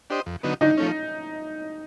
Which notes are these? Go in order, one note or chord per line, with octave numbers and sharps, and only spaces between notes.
D4 G4 C5 D#5
F2
D3 F#3 B3 D#4
D3 D#4
F3 A3 C#4